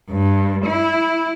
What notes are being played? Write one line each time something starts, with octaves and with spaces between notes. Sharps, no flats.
G2
E4